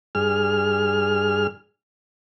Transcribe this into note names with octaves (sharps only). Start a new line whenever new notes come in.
G2 G#4 F6